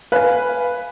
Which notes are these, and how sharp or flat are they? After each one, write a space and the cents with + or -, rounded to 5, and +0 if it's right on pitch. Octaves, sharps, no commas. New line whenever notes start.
B4 +0 F5 +0 G#5 +0